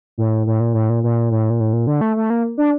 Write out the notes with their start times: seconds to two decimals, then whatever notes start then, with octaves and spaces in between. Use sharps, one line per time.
0.18 A2
0.47 A2
0.60 A#2
0.74 A2
0.89 A#2
1.03 A#2
1.31 A2
1.50 A#2
1.60 A2
1.73 A#2
1.87 D3
2.01 A3
2.16 A3
2.30 A#3
2.58 D4